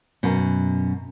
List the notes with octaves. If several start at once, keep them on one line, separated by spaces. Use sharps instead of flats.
F#2 B2